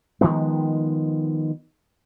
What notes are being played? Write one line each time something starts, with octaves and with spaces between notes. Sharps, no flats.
D#3 F3 G#3 B3